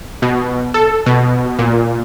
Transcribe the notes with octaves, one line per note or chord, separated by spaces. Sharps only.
B2
A4
B2
A#2